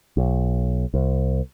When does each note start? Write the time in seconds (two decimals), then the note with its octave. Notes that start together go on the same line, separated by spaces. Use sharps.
0.17 B1
0.94 C2